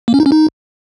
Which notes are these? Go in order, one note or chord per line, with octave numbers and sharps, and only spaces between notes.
A#3
C#4
D#4
C#4
D#4